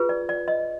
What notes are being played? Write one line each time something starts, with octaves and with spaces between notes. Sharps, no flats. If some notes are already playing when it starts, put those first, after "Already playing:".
Already playing: F4 G#4 B4
D5
D5
D#5